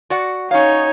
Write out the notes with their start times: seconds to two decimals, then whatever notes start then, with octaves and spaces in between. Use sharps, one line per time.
0.10 F#4 D5 F#5
0.51 C#4 D#4 C#5 F5